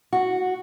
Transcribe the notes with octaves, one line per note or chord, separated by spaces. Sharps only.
F#4